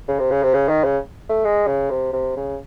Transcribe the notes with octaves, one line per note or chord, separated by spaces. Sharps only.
C#3
C3
C#3
C3
C#3
D#3
C#3
A3
G#3
C#3
C3
C3
C#3